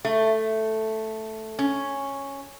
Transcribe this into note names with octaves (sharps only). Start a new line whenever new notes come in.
A3
C#4